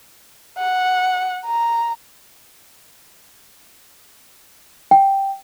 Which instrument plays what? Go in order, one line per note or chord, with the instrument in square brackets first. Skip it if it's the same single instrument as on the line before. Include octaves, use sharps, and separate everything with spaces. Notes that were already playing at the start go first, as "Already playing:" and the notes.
[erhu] F#5
A#5
[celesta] G5